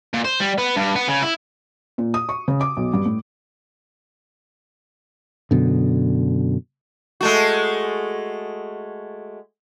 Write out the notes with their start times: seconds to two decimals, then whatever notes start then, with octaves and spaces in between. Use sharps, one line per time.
0.13 A#2
0.25 C5
0.40 G3
0.58 B3
0.77 G2
0.96 B3
1.09 C#3
1.22 E4
1.98 A#2
2.14 D#6
2.29 C#6
2.48 C#3
2.61 D6
2.77 B1
2.94 G2
3.06 A2
5.51 F#2 B2 D3
7.21 G#3 A3 F#4